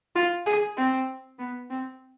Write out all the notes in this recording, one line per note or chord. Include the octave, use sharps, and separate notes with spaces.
F4
G#4
C4
B3
C4